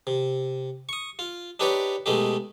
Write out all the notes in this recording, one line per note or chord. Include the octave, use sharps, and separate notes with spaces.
C3
C#6 D#6
F4
D4 D#4 G4 B4 C#5 D5
B2 G#3 A3 D#4 G4